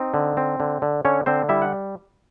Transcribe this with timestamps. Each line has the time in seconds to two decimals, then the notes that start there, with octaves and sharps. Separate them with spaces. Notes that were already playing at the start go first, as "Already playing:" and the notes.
Already playing: C4 D#4 D#5
0.14 D3
0.37 C4
0.60 D3
0.82 D3
1.05 D3 C#4 C#5
1.26 D3 C4 C5
1.49 G3 E4 E5
1.62 F#5